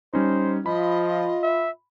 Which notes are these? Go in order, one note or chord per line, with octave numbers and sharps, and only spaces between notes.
G3 C#4 D#4 C5
F3 F4 D#5 B5
E5